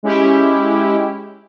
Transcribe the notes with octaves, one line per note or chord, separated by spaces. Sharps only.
G#3 C#4 E4 G4